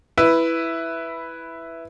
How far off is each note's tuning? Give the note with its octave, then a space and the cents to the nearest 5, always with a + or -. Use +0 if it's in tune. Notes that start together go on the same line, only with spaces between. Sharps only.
E4 +0 B4 +0